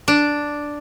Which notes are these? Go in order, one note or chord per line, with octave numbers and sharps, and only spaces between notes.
D4